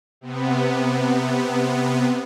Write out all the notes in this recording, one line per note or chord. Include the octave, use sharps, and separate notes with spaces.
C3 B3